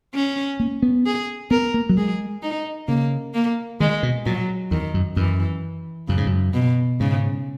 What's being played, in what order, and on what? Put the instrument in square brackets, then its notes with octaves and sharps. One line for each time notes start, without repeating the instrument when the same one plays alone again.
[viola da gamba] C#4
[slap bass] A#3
B3
[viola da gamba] G#4
[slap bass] B3 [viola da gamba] A#4
[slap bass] A#3
F#3
[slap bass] G#3 [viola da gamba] G#4
[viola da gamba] D#4
[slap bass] C#3 [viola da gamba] A#3
[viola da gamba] A#3
[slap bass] D#3 [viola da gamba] G#3
[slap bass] B2
[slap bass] A#2 [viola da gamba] F#3
[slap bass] E2 [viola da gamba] D#3
[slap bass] F#2
[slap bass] F#2 [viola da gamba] E3
[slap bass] F#2 [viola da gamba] C#3
[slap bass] G#2
F#2
[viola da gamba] B2
[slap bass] G#2 [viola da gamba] C#3